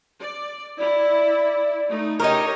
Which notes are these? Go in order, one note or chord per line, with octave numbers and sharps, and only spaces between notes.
D5
E4 D5
A3 D#4
D#4 G4 A#4 C#5 D#5